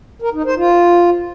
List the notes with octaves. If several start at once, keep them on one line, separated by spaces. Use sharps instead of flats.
A#4
D#4
C5
F4